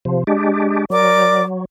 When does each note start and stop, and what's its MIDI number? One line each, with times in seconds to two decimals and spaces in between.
0.05 0.24 48
0.05 0.24 53
0.27 0.85 56
0.27 0.85 62
0.27 0.85 67
0.90 1.65 54
0.90 1.42 70
0.90 1.42 74
0.90 1.42 86